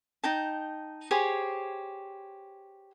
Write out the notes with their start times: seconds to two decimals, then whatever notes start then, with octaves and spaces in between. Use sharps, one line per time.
0.24 D#4 G5 A5
1.11 G4 G#4 C5 C#5